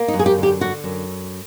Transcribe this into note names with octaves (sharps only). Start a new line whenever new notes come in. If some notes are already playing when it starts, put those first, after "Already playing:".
Already playing: A#3
D#4
F#2
G#4
G4
D3
G4
D3 F#4
F#2